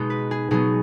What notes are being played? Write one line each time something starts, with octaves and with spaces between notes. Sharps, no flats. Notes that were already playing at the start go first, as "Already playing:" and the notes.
Already playing: B2 G#3 B3 D#4
B4
G#4
B2 F#3 B3 D#4 G#4